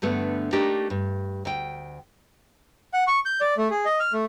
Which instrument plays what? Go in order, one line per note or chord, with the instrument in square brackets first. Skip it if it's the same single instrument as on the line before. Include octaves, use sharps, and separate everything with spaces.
[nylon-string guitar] G2 D3 A3 B3
A3 A#3 D4 D#4 G4
G2
D2 G5
[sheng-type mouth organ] F#5
C#6
G6
D5
A3
G#4
D#5
F6
A3